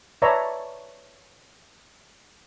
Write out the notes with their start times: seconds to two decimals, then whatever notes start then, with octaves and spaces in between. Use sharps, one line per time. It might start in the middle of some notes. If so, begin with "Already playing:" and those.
0.22 B4 C#5 D5 E5 A5 A#5